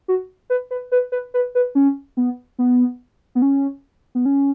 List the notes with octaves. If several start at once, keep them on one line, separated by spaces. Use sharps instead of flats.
F#4
B4
B4
B4
B4
B4
B4
C#4
B3
B3
B3
C#4
B3
C#4